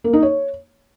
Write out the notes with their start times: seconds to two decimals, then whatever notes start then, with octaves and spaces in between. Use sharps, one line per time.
0.04 A#3
0.13 D#4
0.22 C#5